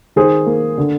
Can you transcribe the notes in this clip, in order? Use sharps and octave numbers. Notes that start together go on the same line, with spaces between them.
D#3 G#4 C5
A#3
D3